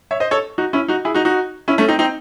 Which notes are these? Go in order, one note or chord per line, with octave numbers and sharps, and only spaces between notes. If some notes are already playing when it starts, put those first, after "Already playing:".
C#5 E5
C5 D#5
A4 C#5
D#4 F#4
C#4 E4
D#4 F#4
E4 G#4
D#4 F#4
D#4 F#4
C#4 E4
A3 C#4
C4 D#4
C4 D#4